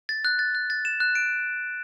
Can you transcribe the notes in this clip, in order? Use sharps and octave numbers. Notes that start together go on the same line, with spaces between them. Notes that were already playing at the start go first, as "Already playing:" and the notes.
A6
F#6
A6
F#6
A6
E7
F#6
D7